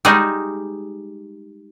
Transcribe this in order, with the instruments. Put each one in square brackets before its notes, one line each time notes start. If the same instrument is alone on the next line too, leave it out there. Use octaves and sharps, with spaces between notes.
[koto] G3 G#3 D#4 F#4 G#4